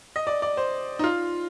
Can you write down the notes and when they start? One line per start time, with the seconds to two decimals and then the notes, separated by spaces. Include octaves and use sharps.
0.16 D#5
0.27 D5
0.42 D5
0.57 C5
0.99 D#4
1.04 F4